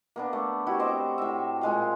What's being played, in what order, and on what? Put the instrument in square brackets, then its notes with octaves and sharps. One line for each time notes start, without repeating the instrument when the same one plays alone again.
[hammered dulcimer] A#3 B3 D4
A3
E4 F#4 G4
C4 C5 D#5 D6
A2 E5
A#2 G#3 F5